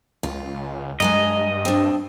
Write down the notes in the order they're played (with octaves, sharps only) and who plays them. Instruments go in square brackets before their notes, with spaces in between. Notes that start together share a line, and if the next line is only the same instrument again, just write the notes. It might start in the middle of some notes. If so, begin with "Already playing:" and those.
[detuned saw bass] C#2 [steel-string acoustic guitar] F4
[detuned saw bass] G2 [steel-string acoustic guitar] G#3 G#5 A#5 [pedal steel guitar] D#5
[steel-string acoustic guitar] C4 D4